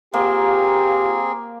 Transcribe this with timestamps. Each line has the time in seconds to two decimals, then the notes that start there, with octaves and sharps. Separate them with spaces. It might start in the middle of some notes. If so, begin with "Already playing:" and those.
0.14 A#3 C4 F4 G4 G#4